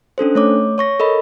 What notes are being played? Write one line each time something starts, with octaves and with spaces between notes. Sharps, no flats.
C#4 D4 A4 C5
A3 C#5 D6
C#5 C#6 A#6
A4 A#4 D#5 B5